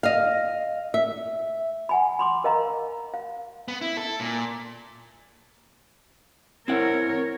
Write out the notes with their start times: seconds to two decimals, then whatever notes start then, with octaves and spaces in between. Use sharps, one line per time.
0.03 D#5 F5
0.94 E5
1.89 F#5 G#5 B5
2.19 B5 C6 D6
2.44 A#4 D#5 F5 A#5
3.14 F5
3.68 B3
3.81 E4
3.97 A4
4.20 A#2
6.68 C4 E4 A#4 C#5 F#5